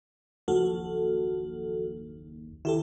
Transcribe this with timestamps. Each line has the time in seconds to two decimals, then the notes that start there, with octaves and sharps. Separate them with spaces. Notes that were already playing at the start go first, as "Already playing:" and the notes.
0.48 F#1 D#2 F3 F#4 A4
2.65 D#3 E4 G4 A4